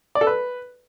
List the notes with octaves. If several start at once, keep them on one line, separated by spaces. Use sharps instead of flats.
D5
A4
B4